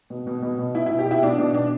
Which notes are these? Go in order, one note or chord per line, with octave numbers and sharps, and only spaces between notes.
B2
B2
B2
B2
B2 E4
E4
B2
G4
B2 E4
B2 D4
B2 D4
B2 D4